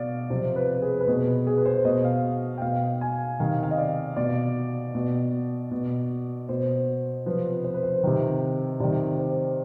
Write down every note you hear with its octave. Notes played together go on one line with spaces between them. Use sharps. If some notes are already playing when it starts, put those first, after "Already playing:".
Already playing: B2 D5 F5
C3 F3 C5
B4
G#4
B4
B2 G#4
G#4
B4
C5
B2 D#5
F5
G5
B2 F5
G#5
C3 D#3 F5
F5
D#5
D5
B2 D5
B2
B2
B2 C5
C3 F3 B4
C5
B4
C5
C3 D#3
C3 D#3 D5
C5